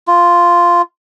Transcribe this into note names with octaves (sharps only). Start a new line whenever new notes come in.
F4